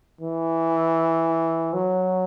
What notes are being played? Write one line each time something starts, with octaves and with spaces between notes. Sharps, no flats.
E3
F#3